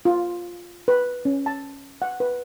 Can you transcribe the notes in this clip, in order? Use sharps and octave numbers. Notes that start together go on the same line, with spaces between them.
F4
B4
C#4
A5
F#5
B4